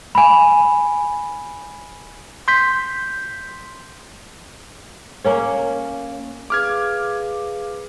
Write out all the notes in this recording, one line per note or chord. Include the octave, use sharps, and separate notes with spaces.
G#5 B5
C6 G6 B6
A#3 C#4 C#5
G#4 B4 F5 D6 F6 G#6